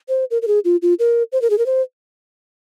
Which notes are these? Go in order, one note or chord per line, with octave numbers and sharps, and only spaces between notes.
C5
A#4
A#4
G#4
F4
F4
A#4
C5
A#4
G#4
A#4
C5